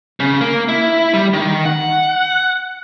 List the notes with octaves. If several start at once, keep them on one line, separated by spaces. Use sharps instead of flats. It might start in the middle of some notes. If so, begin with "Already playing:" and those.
C#3
A#3
E4
G3
D#3
F#5